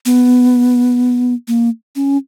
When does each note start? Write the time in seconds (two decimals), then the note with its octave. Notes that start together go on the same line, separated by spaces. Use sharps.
0.06 B3
1.48 A#3
1.96 C#4